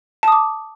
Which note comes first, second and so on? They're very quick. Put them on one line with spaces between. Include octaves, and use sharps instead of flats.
A5 D#6 D6